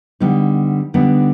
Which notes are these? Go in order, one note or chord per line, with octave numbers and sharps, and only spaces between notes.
D3 G3 B3 D#4
D3 G3 B3 D#4